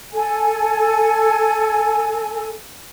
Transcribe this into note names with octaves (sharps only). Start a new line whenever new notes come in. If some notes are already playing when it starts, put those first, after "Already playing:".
A4 G#5